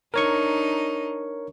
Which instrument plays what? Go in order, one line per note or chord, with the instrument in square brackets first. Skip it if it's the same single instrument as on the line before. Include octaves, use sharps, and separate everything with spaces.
[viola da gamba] D4 D#4 [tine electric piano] A#4 C#5 C#6